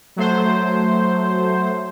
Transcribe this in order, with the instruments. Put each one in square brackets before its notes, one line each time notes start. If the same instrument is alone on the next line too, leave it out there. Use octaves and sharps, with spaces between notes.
[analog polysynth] F#3 A3 C5